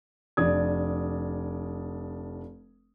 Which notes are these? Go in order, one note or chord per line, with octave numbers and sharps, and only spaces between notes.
F1 D4 D5 D#6 G#6